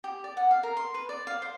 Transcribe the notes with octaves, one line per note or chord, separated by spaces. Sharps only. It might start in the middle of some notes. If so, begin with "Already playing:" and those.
G4
D5
F#5
F5
A#4
C6
B4
D5
F5
C5